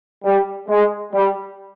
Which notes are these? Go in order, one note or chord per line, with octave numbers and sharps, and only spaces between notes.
G3
G#3
G3